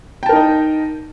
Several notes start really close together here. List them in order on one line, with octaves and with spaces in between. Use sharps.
G5 A5 A#4 D#4 D#5